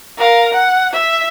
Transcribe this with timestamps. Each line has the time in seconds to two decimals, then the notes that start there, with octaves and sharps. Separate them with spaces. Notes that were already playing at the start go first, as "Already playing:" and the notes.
0.18 A#4 F5
0.52 F#5
0.93 E5